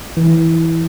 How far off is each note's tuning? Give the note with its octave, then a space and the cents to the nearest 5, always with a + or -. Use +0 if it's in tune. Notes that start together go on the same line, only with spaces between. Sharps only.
E3 -10